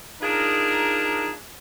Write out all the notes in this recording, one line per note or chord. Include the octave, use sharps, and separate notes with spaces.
D4 D#4 F4 G#4 A#4